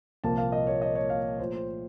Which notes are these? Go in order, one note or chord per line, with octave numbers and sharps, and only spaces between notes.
C2 A#2 F3 A#3 A5
F5
D#5
C#5
D#5
C#5
F5
A#2 F3 A3 C5
C5